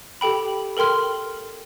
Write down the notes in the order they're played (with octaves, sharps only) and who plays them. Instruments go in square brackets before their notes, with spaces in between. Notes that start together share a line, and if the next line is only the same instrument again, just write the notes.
[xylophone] G4 A4 G5 B5
A4 A#4 G5 C6 F6